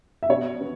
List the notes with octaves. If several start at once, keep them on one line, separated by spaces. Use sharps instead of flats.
E5
B2 C#5
B3